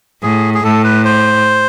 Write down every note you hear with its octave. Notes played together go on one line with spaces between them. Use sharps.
A2 G#4
G#4
A2 A4
B4
C5